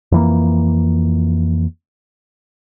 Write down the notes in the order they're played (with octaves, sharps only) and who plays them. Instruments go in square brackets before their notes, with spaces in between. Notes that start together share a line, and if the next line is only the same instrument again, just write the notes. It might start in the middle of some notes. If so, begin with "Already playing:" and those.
[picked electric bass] F2 E3 A#3